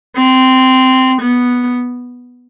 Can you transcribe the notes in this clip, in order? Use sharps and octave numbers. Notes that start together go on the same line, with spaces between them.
C4
B3